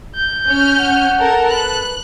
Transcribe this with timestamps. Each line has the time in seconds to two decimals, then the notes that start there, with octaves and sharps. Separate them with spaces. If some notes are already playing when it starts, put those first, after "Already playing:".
0.16 G6
0.47 C#4 F6
0.79 F#5
1.18 A4 A#4
1.50 B4 F#6